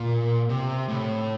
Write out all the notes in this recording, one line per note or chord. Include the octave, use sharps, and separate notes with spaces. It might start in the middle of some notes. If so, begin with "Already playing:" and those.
Already playing: A#2
C3
A2